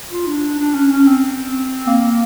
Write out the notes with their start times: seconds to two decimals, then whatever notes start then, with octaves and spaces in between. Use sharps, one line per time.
0.11 F4
0.27 D4
0.59 D4
0.74 C#4
0.91 C#4
1.07 C4
1.87 A#3